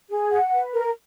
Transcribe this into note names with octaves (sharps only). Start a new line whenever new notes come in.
G#4
F#5
B4
A#4